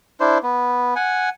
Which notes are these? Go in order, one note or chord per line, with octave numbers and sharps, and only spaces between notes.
D4 E4 C5
B3
F#5 G#5